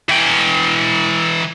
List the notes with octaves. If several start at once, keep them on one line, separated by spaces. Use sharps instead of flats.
E3 G5